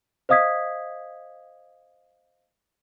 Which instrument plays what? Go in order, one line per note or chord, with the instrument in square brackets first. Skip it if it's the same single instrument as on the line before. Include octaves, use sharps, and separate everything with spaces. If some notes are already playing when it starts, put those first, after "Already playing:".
[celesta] C5 D#5 F5 D#6 G#6 B6